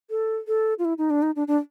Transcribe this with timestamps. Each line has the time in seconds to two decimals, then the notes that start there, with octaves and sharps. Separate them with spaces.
0.10 A4
0.47 A4
0.79 F4
0.85 E4
0.98 D#4
1.10 D4
1.22 D#4
1.36 D4
1.48 D4